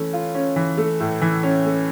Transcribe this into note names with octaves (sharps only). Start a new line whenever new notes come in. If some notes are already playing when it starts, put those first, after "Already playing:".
Already playing: E3 A3 C#4
F4
C#4
E3
A3
A2
E3
C#4
A3